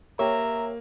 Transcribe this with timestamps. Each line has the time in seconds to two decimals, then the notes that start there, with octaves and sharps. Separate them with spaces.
0.19 A#3 G4 C#5 E5 A#5